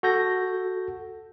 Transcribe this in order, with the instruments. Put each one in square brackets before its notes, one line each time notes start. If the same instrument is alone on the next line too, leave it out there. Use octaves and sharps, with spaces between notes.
[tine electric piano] F#4 A4 G6 A#6